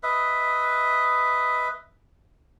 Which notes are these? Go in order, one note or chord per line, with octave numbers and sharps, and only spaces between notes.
B4 D#5 E5